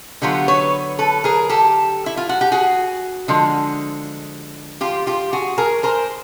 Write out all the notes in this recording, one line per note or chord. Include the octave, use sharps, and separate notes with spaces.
D3 F#3 B3 F4 G4
B4 C#5
A4 B4
G#4 A#4
G4 A4
E4
F4
F#4
G4
F#4 G#4
D3 F3 G#3
F4 G4
F4 G4
F#4 G#4
G#4 A#4
A#4 C5